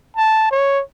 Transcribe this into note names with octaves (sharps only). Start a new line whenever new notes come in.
A5
C#5